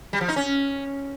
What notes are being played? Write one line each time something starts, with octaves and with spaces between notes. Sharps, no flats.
G3
F3
D#4
C#4